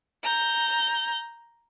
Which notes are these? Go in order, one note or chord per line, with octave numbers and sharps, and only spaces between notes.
A#5 G6